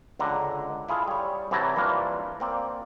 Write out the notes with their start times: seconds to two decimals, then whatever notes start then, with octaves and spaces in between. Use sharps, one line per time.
0.19 C#2 D3 A#5
0.89 E4 F4 G#4 A4 F5
1.08 G3 C#5
1.51 C2 E3 F#3 E4 A5 A#5
1.76 E3 G3 A#3 D4 F4
2.40 A#3 C4 D5